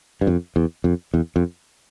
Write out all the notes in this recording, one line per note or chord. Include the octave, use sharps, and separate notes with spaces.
G2
F2
E2
F2
E2
F2